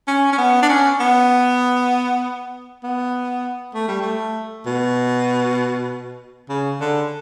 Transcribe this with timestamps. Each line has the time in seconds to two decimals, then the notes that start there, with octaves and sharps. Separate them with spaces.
0.08 C#4
0.32 C#4
0.38 B3
0.62 D4
0.69 C#4
1.00 B3
2.84 B3
3.75 A3
3.88 G3
4.01 A3
4.66 B2
6.49 C#3
6.81 D3